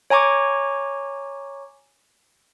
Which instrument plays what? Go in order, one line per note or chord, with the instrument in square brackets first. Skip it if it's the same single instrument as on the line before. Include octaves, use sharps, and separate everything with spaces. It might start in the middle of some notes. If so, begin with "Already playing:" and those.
[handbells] C#5 G#5 A#5 C#6 D6